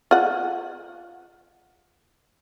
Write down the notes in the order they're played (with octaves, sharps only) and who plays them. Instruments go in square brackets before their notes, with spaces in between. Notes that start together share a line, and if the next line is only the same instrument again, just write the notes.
[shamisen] F4 F#5